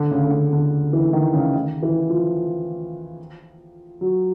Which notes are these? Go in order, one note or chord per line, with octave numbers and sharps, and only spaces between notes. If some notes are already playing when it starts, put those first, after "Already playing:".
Already playing: D3
C#3
D3
C#3
D3
E3
D#3
C#3
D#3
E3
F3
F#3